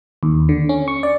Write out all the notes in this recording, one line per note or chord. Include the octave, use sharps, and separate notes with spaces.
D#2
D3
C#4
C#6
D5